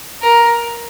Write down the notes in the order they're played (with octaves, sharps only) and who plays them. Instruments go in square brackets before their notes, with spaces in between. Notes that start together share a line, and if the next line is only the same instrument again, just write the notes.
[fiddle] A#4